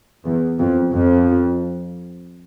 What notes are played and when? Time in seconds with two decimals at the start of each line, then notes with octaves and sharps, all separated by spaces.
0.26 E2
0.59 F2
0.94 F2